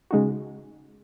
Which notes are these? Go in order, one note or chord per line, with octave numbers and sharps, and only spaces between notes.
C#3 G#3 D#4 F#4